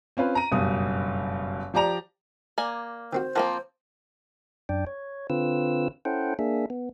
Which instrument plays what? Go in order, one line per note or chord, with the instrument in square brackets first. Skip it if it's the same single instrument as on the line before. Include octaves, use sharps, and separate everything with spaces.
[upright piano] C4 C#4 F4 B4
A#5 D#7
F#1 G2 B2 D#6
F3 G4 D5 A#5 F7
[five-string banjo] A#3 D5 G#5
[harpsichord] D#3 C4 F#4 [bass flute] C5
[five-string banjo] F3 A#3 C4 [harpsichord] A#4 F#5
[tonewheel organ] F#2 D4 D5 G5
C#5
D3 C4 F4 B4 E6
C#4 E4 A4 C5 F#5 G5
A#3 D4 G#4 E5
B3